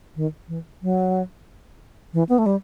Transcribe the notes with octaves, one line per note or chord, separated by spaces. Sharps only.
D#3
E3
F#3
E3
B3
A3
G3